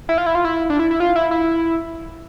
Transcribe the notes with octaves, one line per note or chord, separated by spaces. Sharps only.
E4
F4
E4
F4
E4
D4
E4
E4
F4
E4
E4